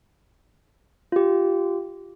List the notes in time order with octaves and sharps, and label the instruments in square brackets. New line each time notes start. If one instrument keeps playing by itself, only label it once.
[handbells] F4 G4